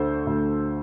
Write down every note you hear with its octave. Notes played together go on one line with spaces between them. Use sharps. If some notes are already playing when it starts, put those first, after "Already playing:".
Already playing: D2 D3 A4 C5
D2